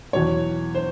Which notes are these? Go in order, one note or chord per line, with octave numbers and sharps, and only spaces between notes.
E2 B2 F#3 C#5
C5